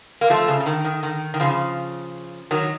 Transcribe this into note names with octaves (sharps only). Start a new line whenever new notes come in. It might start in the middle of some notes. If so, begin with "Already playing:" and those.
A#3
F3 A3
C#3
C#3
D#3
D#3
D#3
D#3
C#3 F3
D#3 F#3